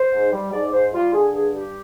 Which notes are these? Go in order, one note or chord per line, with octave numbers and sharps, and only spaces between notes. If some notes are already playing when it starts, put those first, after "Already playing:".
Already playing: C5
G#2
G3
G#2 D5
G#2 C5
G3 F4
D3 G#4
G2 G#4
G3 G4